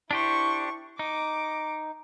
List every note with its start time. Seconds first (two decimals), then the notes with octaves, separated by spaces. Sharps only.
0.11 D4 E4 G4 C5 C#6
0.99 D#4 D6